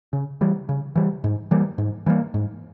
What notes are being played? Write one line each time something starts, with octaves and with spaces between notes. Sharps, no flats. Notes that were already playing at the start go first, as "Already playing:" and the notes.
C#3
E3 G3
C#3
E3 G3
G#2
E3 G3 A#3
G#2
E3 G3 A#3
G#2